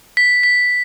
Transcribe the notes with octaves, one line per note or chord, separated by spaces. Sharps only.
B6
B6